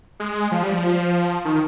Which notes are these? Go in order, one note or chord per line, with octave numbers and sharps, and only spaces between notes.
G#3
F3
G3
F3
D#3